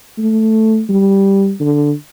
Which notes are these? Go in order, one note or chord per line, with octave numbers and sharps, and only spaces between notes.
A3
G3
D3